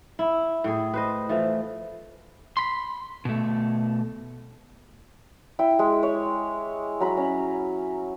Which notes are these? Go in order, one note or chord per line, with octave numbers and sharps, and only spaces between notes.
E4
A2 G#4
B4 C5 D#5
E3 F3 A3
B5 C6
B2 A3
E4 G5
G#3
C#5
F#3 A#5 B5
C#4